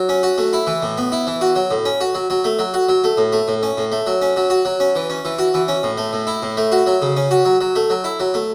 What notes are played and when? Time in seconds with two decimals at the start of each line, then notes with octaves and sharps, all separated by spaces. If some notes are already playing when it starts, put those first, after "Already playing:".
Already playing: F#3
0.09 C#4
0.23 F#4
0.38 A3
0.53 E4
0.67 E3
0.83 A2
0.98 B3
1.12 E4
1.27 E3
1.41 F#4
1.56 F#3
1.71 A2
1.85 C#4
2.01 F#4
2.15 F#3
2.30 F#3
2.44 A3
2.59 F#3
2.74 F#4
2.89 F#3
3.04 A3
3.17 A2
3.32 A3
3.48 A2
3.63 C#4
3.77 A2
3.92 A3
4.07 F#3
4.22 C#4
4.36 F#3
4.50 F#4
4.65 F#3
4.80 C#4
4.95 E3
5.10 C#4
5.25 E3
5.38 F#4
5.54 E3
5.68 C#4
5.83 A2
5.97 A3
6.13 A2
6.27 E4
6.42 A2
6.57 A3
6.72 F#4
6.87 F#3
7.02 C#3
7.17 C#4
7.31 F#4
7.45 F#3
7.61 F#3
7.76 A3
7.90 F#3
8.04 E4
8.20 F#3
8.34 A3